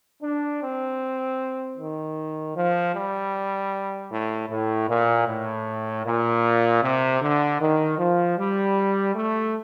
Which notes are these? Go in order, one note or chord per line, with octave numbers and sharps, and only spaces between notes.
D4
C4
D#3
F3
G3
A2
A2
A#2
A2
A#2
C3
D3
D#3
F3
G3
A3